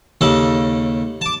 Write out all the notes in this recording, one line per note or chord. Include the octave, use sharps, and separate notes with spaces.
D#2 C#3 A4
A5 D6